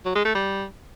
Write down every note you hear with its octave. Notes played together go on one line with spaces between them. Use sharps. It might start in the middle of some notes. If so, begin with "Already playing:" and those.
F#3
G#3
A3
G3